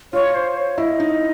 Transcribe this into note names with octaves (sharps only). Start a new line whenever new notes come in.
F4 C#5
C5
C#5
E4 D#5
D#4